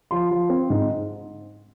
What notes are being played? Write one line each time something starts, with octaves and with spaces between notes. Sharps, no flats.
F3 C6
F3
C4
G#2